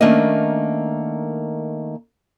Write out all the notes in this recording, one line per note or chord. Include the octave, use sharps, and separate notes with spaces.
D#3 A3 A#3 C#4 D4 D#5